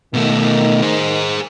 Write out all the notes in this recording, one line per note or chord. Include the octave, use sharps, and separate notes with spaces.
B2 D#3 A3
G#4 C5